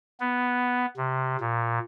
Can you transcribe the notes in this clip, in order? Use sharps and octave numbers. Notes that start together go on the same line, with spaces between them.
B3
C3
A#2